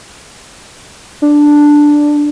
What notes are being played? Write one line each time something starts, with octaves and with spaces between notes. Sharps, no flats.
D4